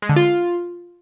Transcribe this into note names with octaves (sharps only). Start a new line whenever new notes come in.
G#3
D3
F4